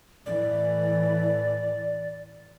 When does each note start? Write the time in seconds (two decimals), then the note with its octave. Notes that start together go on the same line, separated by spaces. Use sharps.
0.26 A2 E3 D5